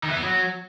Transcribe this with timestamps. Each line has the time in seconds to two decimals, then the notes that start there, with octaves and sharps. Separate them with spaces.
0.03 D#3
0.10 E3
0.16 B3
0.22 F#3